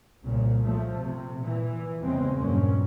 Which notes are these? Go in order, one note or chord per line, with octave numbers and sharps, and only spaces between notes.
C2 A#2 C#3
F3 A3
C3
A#2 E3
E2 C#3 G#3 C4
G2 A#2 F#3 A#3 C#4